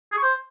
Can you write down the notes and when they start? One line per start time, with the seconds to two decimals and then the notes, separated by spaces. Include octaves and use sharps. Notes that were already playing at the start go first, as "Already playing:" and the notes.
0.12 G#4
0.18 C#6
0.23 C5